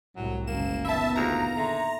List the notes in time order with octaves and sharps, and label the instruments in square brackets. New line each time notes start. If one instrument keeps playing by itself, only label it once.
[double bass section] C2 A2 [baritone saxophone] F#3
[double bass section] F#1 C#3 G#3 [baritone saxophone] A#3 [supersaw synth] E7
[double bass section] A#2 D#3 B3 [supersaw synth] E5 A5 [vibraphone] B5
[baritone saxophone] D2 [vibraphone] F4 G#4 F5 [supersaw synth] A#5
[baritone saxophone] D3 [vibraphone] E5 C6